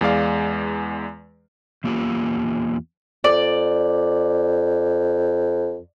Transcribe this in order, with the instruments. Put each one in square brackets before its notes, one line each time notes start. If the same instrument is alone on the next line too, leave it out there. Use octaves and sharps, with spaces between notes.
[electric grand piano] E2 G#3 D5 F5
[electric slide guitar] E2 A#3 F4 G4
[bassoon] F2 [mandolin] D5